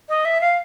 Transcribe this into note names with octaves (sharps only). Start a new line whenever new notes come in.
D#5
E5
F5